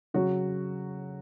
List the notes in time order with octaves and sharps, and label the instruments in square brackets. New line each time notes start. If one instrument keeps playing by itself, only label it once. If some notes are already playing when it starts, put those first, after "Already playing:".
[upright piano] C#3 F#3 F#4